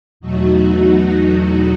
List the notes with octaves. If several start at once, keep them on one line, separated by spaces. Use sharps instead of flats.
E2 B2 F#3 A3 D#4 F#4